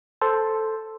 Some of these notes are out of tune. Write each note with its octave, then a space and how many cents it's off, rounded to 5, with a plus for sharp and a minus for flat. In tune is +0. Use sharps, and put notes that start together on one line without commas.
A4 +0 C5 +0